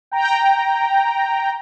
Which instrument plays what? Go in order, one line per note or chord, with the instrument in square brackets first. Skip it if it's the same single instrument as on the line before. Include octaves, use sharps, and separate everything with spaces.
[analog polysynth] G5 A#5